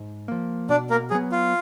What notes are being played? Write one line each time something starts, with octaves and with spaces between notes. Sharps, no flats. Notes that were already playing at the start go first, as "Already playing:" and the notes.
Already playing: G#2
F3 A#3
B2 D4 D5
A#3 A#4
F#3 B3 G#4
F4